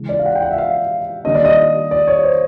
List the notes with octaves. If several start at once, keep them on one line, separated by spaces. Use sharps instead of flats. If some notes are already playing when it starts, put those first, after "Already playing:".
Already playing: C#3 E3 G#3
D5
F5
F#5
G5
F#5
E5
F5
D#3 G3 A#3 D4 D#5
D5
D#5
D5
C#5
C5